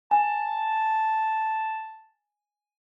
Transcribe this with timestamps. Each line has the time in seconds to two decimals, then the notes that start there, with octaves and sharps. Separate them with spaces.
0.11 G#5 A5